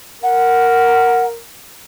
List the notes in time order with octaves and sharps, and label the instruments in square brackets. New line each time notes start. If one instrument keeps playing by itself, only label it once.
[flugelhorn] A#4 [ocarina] F#5